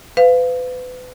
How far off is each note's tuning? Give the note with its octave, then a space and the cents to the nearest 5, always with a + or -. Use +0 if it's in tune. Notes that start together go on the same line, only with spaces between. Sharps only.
B4 +30 F5 +0